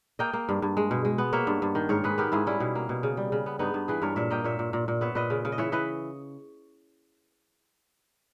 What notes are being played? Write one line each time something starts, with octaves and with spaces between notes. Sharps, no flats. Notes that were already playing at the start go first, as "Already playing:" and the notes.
A#3 D#5 G5
A#3
G2
G2
G#3
B2
G#3
B3
A#3 C#5 E5
G2
G2
D#3
G#2 A#4 C#5
G#2 G#4 B4
B3 G4 A#4
G#2 E4 G#4
G3 C#4 E4
B2
A#3
B2
C#3
G3
C#3
B3
G2 B3 D#4
G2
E3 G#4 B4
G2 A#4 C#5
A#2 C#5 E5
A#3 D#5 G5
A#2 C#5 E5
A#2
A#2
A#2
B3 C#5 E5
A#2 B4 D#5
C#3
C#3
D#5
E3 C#5 E5
E3 B4 D#5